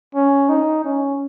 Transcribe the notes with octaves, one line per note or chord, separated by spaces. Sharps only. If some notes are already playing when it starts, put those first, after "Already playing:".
C#4
D#4
C#4